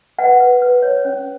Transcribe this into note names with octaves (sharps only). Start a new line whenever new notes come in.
B4 F#5
B4
B4
C#5
C#4